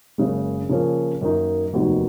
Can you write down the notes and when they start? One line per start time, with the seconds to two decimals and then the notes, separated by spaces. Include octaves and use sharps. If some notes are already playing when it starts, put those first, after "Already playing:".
0.18 F#1 F#2 C#3 G#3
0.69 C#3 F3 A#3 C#4
1.21 F#2 D#3 A#3 D#4
1.73 F1 D#2 D#3 F#3 B3